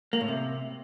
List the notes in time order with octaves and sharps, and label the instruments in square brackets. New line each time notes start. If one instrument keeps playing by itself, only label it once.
[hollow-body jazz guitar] A#3
A2
C3